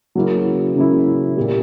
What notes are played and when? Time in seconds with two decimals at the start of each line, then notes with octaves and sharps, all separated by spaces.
0.15 C#3 F#3 A#3 C#4 E4
0.75 C#3 F#3 A#3 C#4 E4
1.37 A#2 G3 A#3